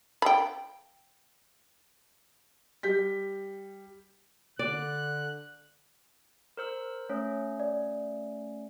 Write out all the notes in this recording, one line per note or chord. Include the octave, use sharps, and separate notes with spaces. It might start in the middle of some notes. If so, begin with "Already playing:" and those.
G5 B5
G3 G6 B6
D3 D5 F#6
A#4 C5 E6
A3 C#4 C#5
D5